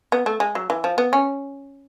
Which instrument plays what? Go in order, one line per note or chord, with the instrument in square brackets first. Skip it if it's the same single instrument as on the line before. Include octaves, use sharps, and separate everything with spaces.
[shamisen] B3
A3
G#3
F#3
E3
F3
B3
C#4